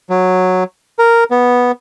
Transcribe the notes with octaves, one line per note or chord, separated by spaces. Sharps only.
F#3
A#4
B3